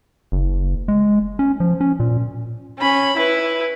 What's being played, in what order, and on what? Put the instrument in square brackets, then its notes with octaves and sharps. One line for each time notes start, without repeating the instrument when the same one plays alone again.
[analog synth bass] F#1
G#3
C#4
F3
C#4
A#2
[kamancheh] C#4 B5
E4 B4